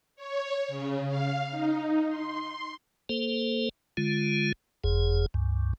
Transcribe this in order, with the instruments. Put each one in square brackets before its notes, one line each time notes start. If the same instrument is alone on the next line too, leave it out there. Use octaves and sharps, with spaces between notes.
[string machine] C#5
C#3
F5
D#4
C6
[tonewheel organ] A#3 A4 C5
D3 G#3 F4
F#1 F2 G#4
C#2 G2